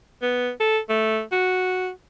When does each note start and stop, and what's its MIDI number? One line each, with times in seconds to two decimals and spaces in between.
0.22 0.50 59
0.60 0.79 69
0.90 1.21 57
1.32 1.90 66